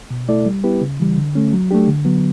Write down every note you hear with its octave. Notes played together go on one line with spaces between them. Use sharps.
B2
A3 E4 A4 D5
G3
B3 E4 G4 B4
C#3
E3 G3
D3
A3 C#4
F#3
A3 D4 G4
D3
F#3 B3